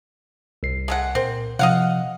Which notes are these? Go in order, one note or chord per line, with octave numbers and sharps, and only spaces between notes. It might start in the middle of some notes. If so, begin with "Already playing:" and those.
C2 C7
G#3 A3 F#5
A#2 C4 A#4
C3 F3 D#5 F5 F#5